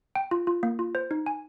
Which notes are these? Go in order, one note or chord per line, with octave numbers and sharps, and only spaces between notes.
G5
F4
F4
A#3
F4
C5
D#4
G#5